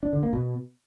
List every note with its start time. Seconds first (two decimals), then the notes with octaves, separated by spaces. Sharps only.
0.03 D4
0.13 D3
0.23 A#3
0.33 B2